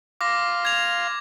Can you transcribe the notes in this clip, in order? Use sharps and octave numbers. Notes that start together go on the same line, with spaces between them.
F5 C6 D6 A#6
G#6 F7